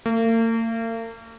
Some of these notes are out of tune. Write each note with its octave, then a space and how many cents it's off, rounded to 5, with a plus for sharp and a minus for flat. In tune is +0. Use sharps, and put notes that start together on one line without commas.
A#3 -45